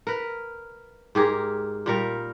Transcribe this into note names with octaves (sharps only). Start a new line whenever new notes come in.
A#4 B4
G#2 G4 G#4 A#4
A#2 G3 A#4